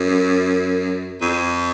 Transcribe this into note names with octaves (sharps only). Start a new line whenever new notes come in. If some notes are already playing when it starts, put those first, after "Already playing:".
Already playing: F#2
F2